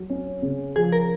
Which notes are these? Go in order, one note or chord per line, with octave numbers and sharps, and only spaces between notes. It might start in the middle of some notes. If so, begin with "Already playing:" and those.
Already playing: F#3
C#4
C#3
F3 G#4
A#4